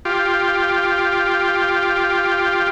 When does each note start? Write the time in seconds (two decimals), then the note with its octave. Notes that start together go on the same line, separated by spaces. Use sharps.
0.05 F4 G4